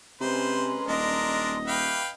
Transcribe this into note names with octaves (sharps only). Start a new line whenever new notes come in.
C3 G#3 C#4 B4 C5 A#5 C6
D#1 D4 A#4 D#5
G4 B4 E5 F5 G5 B5